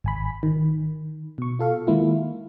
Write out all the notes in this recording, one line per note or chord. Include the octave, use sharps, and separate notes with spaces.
G#1 G#5 B5
D#3
B2 C#6
F4 A4 F5
D#3 G#3 A#3 E4 F4